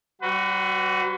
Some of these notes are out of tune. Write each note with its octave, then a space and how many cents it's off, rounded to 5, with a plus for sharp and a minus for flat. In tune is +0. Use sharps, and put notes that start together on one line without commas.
G3 -35 F#4 +0 B4 +40